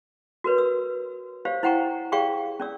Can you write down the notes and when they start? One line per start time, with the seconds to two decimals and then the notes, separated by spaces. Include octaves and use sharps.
0.44 F#4 A#4 B4 C#5
0.58 E6
1.45 G4 C5 C#5 F5
1.63 E4 C5 F#5 G5 A#5 C#6
2.12 G4 G#4 D5 F5 G5 C#6
2.60 C#4 D5 E6